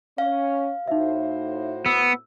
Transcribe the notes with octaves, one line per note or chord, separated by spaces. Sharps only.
C#4 C#5 F5
A2 D#4 F#4 C5 E5
B3 E6